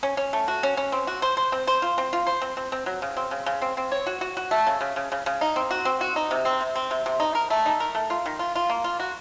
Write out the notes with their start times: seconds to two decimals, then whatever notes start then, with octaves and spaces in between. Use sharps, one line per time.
0.03 C#4
0.17 C#4
0.33 A3
0.48 F#4
0.63 C#4
0.77 C#4
0.92 C4
1.07 F#4
1.22 C5
1.37 C5
1.52 C4
1.67 C5
1.82 F4
1.98 C4
2.13 F4
2.27 C5
2.42 C4
2.57 C4
2.72 C4
2.86 F#3
3.02 C#3
3.17 C4
3.31 C#3
3.46 C#3
3.62 C4
3.77 C4
3.92 C#5
4.07 F#4
4.21 F#4
4.37 F#4
4.51 A3
4.66 C#3
4.81 C#3
4.96 C#3
5.12 C#3
5.26 C#3
5.41 D#4
5.56 C4
5.71 F#4
5.85 C4
6.01 F#4
6.16 D#4
6.31 C3
6.45 C4
6.61 C3
6.76 C4
6.91 C3
7.06 C3
7.20 D#4
7.35 A#4
7.50 A3
7.66 D#4
7.80 A#4
7.95 A3
8.10 F4
8.26 D#3
8.39 F4
8.55 F4
8.69 A#3
8.84 F4
9.00 F#4